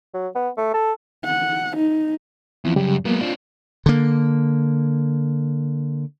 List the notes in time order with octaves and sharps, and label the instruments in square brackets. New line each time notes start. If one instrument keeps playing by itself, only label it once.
[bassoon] F#3
B3
A3
A4
[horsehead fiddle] F#5
D#4
[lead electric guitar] E2 [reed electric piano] F3 C4 E4
[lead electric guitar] F#2 [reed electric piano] C#3 G3 G4
[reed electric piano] F#3 A#3 [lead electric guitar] G#3 B3
[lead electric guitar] C4 D4 [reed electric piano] F4
[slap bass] D3 A#3